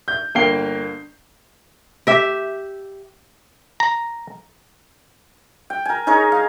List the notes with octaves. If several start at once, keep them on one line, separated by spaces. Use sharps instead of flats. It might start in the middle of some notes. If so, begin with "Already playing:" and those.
G6
G1 A#3 F5 G5 C7 G7
G4 E5
A#5
G5
A#4 G#5
D#4 G#4 A#4 C#5
F5